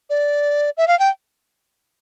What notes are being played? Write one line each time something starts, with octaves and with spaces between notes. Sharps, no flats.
D5
E5
F5
G5